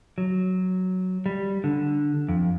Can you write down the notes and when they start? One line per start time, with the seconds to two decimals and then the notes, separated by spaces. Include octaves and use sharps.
0.18 F#3
1.26 G3
1.64 D3
2.28 F2